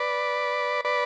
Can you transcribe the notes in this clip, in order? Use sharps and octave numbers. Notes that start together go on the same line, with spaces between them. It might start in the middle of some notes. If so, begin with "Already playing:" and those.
Already playing: B4 D5
B4 D5